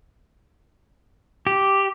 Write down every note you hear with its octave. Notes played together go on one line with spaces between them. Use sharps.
G4